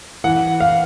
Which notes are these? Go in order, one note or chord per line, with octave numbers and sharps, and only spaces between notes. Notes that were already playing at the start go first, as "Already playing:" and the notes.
E3 F#5
F5